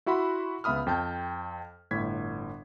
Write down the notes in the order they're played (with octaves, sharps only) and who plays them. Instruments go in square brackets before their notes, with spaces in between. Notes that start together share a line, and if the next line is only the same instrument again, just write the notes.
[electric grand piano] E4 F#4 E5 F#5 B5 C6
C#2 B3 E5 B5 D#6 F6
F2 G5 A5 G6
G1 A2 G#6 B6